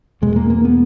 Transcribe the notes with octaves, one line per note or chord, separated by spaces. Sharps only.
E2 B2 G#3
A#3
A#3
B3